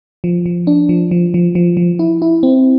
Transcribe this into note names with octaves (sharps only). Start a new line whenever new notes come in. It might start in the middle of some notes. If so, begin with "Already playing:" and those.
F3
F3
D4
F3
F3
F3
F3
F3
E4
E4
C4